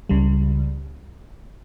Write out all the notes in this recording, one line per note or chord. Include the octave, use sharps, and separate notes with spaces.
C#2 C#3 G3